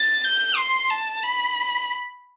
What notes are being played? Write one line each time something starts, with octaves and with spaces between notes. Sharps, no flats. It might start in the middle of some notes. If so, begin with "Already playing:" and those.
Already playing: A6
G6
C6
A5
B5